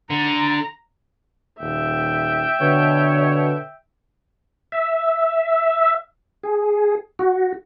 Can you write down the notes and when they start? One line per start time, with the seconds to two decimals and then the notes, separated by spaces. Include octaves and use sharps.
0.10 D3 A#5
1.60 D#1 E5 G5
2.61 B2 D3 C#5
4.72 E5
6.43 G#4
7.19 F#4